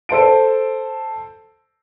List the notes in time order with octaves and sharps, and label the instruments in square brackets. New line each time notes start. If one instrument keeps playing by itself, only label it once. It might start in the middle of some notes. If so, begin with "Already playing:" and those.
[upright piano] A4 C5 A5 D7